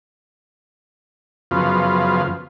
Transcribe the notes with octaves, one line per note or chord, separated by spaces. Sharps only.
F#2 C#3 F3 B3 F4